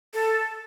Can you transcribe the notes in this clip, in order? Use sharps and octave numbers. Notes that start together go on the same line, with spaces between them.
A4